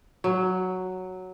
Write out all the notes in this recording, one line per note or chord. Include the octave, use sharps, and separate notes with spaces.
F#3